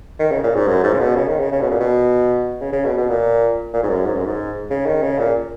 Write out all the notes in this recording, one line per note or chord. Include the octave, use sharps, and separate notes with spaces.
D#3
C#3
A#2
G#2
F#2
G#2
C#3
B2
C#3
D#3
C#3
C#3
B2
A#2
B2
C#3
C#3
B2
B2
A#2
A#2
G#2
F#2
G#2
F#2
G#2
C#3
D#3
C#3
A#2